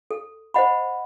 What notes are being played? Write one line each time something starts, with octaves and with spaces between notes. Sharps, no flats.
A4
C5 D#5 F#5 B5